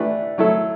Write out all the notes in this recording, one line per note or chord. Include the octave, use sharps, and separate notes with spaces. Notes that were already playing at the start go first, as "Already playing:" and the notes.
Already playing: E3 A3 D4 G4 B4
F#3 A3 E4 A4